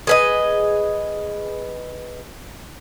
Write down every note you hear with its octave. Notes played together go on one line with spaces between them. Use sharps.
G#4 B4 D#5